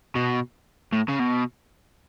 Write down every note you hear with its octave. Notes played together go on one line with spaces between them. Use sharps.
B2
A2
C#3
B2